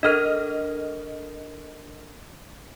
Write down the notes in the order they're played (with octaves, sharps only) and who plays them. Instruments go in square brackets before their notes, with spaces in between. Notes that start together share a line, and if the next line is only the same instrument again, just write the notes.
[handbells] D4 A4 A#4 [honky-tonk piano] D#5 F6